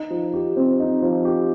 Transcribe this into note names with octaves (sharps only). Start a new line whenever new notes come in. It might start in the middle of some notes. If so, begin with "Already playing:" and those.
Already playing: D#4
F3
G4
C4
D#4
F3
G4